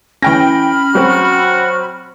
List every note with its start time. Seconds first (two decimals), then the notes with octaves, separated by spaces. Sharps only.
0.22 E3 C#4 G5 B5 F6 A#6
0.95 F#3 C4 F#4